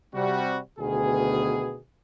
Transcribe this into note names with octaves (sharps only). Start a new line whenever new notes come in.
C3 G3 F#4
D2 B2 D#3 B3 G#4